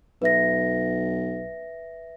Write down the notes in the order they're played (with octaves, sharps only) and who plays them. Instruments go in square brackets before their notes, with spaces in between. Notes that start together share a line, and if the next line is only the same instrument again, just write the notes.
[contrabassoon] B1 [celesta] B4 E5 A#6